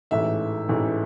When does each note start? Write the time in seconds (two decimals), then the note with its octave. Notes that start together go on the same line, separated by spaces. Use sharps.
0.11 A1 G#2 E3 A3 E5
0.68 A1 G#2 E3 A3